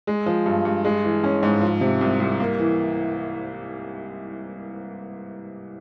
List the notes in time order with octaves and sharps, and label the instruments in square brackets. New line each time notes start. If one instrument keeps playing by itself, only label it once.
[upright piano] G#3
F3
G2
G2
G#3
E3
C#4
G#2
F3
C3
C2
C2
A#3
E3